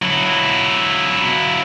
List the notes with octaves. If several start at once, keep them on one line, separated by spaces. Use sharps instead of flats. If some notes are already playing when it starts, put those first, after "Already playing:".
F#3 E4